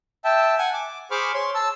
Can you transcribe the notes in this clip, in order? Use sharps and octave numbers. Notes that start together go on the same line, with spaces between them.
E5 G5 A5
F#5 G#5
D6
G#4 C5 B5 C#6 D6 F6
C#5 C6
A5 E6